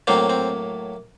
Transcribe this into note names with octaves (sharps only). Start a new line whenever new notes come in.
A2 F#3 A#3 C4
C4